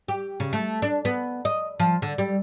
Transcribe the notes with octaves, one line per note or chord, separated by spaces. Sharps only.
G4
C#3
A3
D4
B3
D#5
F3
D3
G3